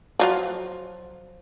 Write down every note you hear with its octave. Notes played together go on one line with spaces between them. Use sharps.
F3 F#3 F4